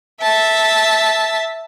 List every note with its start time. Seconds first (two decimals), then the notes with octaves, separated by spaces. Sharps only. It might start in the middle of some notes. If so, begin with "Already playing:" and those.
0.22 E5 A5